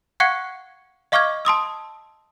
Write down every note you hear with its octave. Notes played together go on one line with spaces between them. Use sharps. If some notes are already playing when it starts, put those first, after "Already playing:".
F5 F#5 C#6 F#6 G#6 C#7
D#5 F5 C#6 D6 F6 G#6
A5 C6 D#6 E6